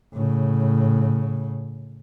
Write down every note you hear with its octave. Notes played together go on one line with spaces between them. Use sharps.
A2 C#3